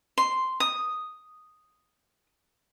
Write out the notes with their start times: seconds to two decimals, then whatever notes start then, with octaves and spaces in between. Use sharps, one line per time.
0.18 C6
0.60 D#6